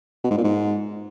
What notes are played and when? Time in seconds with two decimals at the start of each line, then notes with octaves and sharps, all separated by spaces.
0.24 B2
0.31 G#2
0.37 A#2
0.44 G#2